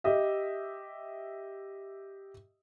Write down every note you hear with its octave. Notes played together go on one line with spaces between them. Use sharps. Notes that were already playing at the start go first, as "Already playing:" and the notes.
G4 D#5 E5